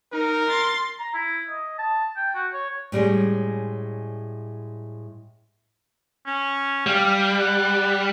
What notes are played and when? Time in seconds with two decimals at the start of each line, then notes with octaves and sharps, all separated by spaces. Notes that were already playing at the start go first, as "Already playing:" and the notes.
0.13 D#4 A#4
0.49 C6 A6
0.99 A#5
1.14 E4
1.50 D#5
1.79 A5
2.17 G5
2.35 F#4
2.53 C#5
2.92 A2 G3 G#3 C#4
6.26 C#4
6.87 G3 F5
7.39 F#5